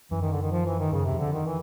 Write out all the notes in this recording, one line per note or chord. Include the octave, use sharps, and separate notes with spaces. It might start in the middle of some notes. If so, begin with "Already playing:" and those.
F#2 E3
D#3
D3
D#3
F3
E3
D#3
F#2 C#3
C3
F2
D3
D#3
E3